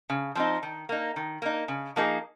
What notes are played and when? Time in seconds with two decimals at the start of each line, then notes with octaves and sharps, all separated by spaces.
0.10 C#3
0.35 F3 C4 D#4
0.63 D#3
0.89 A#3 D#4
1.16 D#3
1.42 A#3 D#4
1.68 C#3
1.96 F3 A#3 D#4 G#4